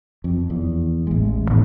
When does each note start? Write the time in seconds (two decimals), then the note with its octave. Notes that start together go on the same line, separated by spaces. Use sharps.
0.24 F2
0.50 E2
1.07 A1 G#3
1.51 A2 D#3 B3